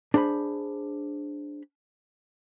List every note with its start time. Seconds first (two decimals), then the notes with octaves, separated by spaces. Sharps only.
0.14 D4 G#4 C5 A#5 B5